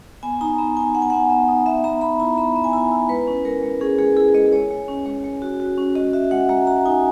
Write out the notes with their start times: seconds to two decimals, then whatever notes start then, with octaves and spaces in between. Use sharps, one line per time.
0.23 B3 G#5
0.41 D#4 A#5
0.59 B3 A#5
0.77 D#4 G#5
0.94 B3 F#5
1.02 G#5
1.10 B3 F#5
1.30 B3
1.48 D#4
1.66 B3 E5
1.84 B3 A#5
2.01 B3 B5
2.20 E4 A#5
2.37 B3 B5
2.56 B3
2.64 G#5
2.73 E4 A#5
2.91 E4
3.09 G#3 B4
3.27 C#4
3.45 G#3 A#4
3.63 G#3
3.81 C#4 G#4
3.99 G#3 G#4
4.17 E4 G#4
4.34 G#3 D#5
4.52 G#3 C#5
4.71 G#3
4.88 C#4
5.06 G#3
5.24 G#3
5.42 F#4
5.60 F#4
5.78 C#4
5.95 F#4 D#5
6.13 F#4 E5
6.31 G#3 F#5
6.49 G#3 A#5
6.67 F#4 A#5
6.85 D#4 G#5